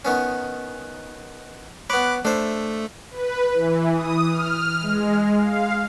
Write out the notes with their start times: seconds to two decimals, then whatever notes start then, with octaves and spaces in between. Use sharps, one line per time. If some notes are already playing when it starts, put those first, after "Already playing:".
0.05 D#3 B3 C#4
1.90 B3 C#5 B5 D6 F#6
2.25 A3 D4 C5 E5
3.11 B4
3.53 E3
3.93 D#6
4.30 F6
4.82 G#3
5.38 F5